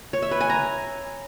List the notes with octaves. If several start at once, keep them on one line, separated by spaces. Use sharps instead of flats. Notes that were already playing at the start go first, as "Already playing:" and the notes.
C#5
E5
B4
G#5
A#5